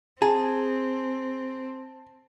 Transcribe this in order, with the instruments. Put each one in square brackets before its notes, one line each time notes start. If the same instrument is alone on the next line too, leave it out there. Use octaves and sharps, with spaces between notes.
[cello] C4 [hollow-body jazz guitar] G#4 [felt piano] A5